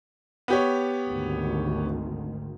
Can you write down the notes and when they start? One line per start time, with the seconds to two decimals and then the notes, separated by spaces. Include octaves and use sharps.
0.48 B3 G4 C#5
1.06 G#1 D2 D#3